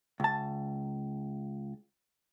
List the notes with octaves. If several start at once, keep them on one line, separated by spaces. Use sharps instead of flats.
C#2 A5